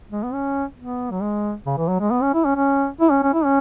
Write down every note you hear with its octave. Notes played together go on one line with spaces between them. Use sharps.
G#3
B3
C#4
B3
F#3
G#3
C#3
E3
F#3
G#3
B3
C#4
E4
C#4
C#4
E4
C#4
C#4
E4
C#4